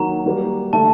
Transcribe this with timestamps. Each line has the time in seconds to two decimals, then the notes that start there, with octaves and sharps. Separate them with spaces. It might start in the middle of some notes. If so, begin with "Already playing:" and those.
Already playing: D#3 F#3 A#3 A#5
0.26 G3 A#3 F#4 A#4
0.73 D3 A3 D4 A4 A5